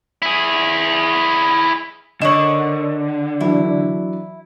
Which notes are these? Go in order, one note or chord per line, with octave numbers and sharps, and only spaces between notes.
E4 G#4
D3 D#4 A#4 C#5 E7 F#7
E3 F#3 D4 E4